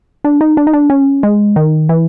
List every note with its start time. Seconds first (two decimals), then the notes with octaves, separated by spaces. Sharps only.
0.24 D4
0.41 D#4
0.57 D4
0.67 D#4
0.73 D4
0.90 C#4
1.23 G#3
1.56 D#3
1.89 E3